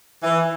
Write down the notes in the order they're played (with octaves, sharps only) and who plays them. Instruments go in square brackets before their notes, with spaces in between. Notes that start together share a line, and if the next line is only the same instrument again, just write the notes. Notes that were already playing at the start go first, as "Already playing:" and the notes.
[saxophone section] E3